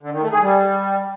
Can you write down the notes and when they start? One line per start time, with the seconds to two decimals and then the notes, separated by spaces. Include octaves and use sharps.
0.03 D3
0.13 D#3
0.22 A3
0.32 G#4
0.41 G3